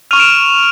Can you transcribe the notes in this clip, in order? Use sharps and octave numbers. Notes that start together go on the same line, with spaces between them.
C#6 F6 D#7 F7
D7 E7